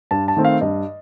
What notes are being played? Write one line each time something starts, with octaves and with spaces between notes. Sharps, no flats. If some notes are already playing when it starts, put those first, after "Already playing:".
G2 A5
A5
D#3 A3 C4
F5
G2 D#5